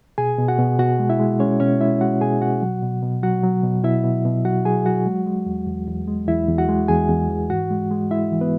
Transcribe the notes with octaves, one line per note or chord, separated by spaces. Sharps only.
B2 G#4 G#5
B2
F#4 F#5
B2
B2 F#4 F#5
G#3
E4 E5
G#3
G#3 C#4 C#5
B2 C#4 C#5
G#3 E4 E5
G#3 F#4 F#5
B2 G#4 G#5
B2 F#4 F#5
F#3
B2
B2
F#3 F#4 F#5
F#3
B2
B2 E4 E5
B2
B2
F#3 F#4 F#5
F#3 G#4 G#5
F#3 F#4 F#5
G#3
G#3
E2
E2
E2
G#3
E2 E4 E5
E2
F#4 F#5
G#3
E2 G#4 G#5
E2
E3
G#2 F#4 F#5
G#3
G#3
G#3 E4 E5
E3
B3 B4